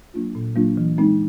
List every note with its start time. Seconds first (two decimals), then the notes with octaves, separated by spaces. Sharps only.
0.14 F#3 A#3 D4 F4
0.35 A#2
0.55 F#3 A#3 D4 F4
0.77 E3
0.98 G#3 C4 D#4